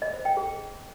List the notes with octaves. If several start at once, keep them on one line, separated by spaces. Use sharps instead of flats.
D#5
C5
G5
G#4